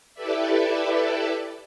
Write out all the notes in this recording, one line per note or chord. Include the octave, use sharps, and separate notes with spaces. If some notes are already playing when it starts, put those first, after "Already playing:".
E4 G4 A4 B4 D5 E5